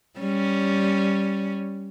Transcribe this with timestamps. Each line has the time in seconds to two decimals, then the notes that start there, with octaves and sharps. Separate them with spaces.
0.20 G3 C#4